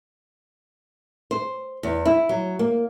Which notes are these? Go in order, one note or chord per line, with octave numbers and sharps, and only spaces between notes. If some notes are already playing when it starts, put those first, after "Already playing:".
C5
E2
E4
F#3
A#3